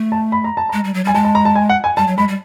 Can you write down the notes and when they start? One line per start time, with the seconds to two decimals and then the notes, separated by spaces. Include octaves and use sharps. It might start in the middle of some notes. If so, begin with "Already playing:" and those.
Already playing: A3
0.12 A5
0.32 B5
0.44 A#5
0.57 A5
0.69 G#3 A#5
0.84 G3
0.94 F#3
1.04 G3
1.07 G#5
1.15 G#3 A5
1.25 A5
1.35 A#5
1.45 A5
1.56 G#5
1.69 F#5
1.84 G#5
1.97 G3 A5
2.07 F#3
2.17 G#3 B5
2.28 G3